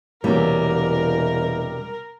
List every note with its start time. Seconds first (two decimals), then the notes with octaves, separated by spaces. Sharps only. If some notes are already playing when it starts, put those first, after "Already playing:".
0.24 E1 C3 E3 G3 A#3 C#4 F#4 A#4